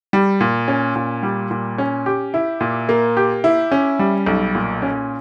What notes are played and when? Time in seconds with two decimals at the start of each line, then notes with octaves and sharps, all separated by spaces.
0.13 G3
0.41 A#2
0.68 C#4
0.96 A#2
1.23 G3
1.51 A#2
1.78 C#4
2.06 G4
2.34 E4
2.61 A#2
2.89 A#3
3.17 G4
3.44 E4
3.72 C#4
3.99 G3
4.27 B1
4.55 A#2
4.82 C#4